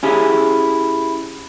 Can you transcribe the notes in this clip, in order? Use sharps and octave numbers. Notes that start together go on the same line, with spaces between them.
C#4 E4 G4 G#4